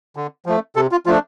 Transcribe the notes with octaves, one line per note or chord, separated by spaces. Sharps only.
D3
F3 A3
C3 A4
F4
F3 A3 D4 F4